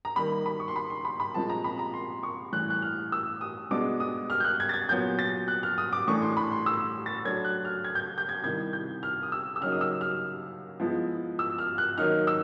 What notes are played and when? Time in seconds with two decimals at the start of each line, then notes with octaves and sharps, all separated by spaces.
0.05 A#5
0.16 D#3 G3 A#3 B5
0.46 B5
0.60 C#6
0.68 C6
0.76 B5
0.90 C6
1.05 B5
1.20 B5
1.34 A#2 F3 G#3 C4 A5
1.50 A#5
1.64 B5
1.79 A#5
1.94 C6
2.23 C#6
2.52 A2 E3 G3 F#6
2.70 F#6
2.82 F6
3.12 E6
3.41 D#6
3.71 B2 G#3 B3 D4 D6
4.00 D#6
4.30 F6
4.40 G6
4.44 F#6
4.60 G#6
4.69 A6
4.74 G#6
4.89 A#2 F#3 B3 G6
5.19 A6
5.48 F#6
5.63 F6
5.78 D#6
5.93 D6
6.07 A2 E3 A3 D4 C#6
6.22 C6
6.37 B5
6.52 C6
6.66 E6
7.06 A6
7.25 F#3 A3 D4 G#6
7.45 F#6
7.65 F6
7.84 G#6
7.95 G6
8.00 G#6
8.18 G6
8.29 G#6
8.44 C3 D#3 G3 C4 E4 G#6
8.73 G6
9.03 F6
9.23 D#6
9.32 E6
9.56 E6
9.61 C#3 F#3 A#3 D#4 F6
9.72 D#6
9.81 E6
10.01 F6
10.80 F3 G#3 B3 E4
11.39 E6
11.58 F6
11.78 F#6
11.98 D#3 F#3 A#3 D#4 F6
12.27 E6